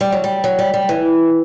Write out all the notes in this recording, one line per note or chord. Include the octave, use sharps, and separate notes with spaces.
G3
F#3
G3
F#3
G3
G3
E3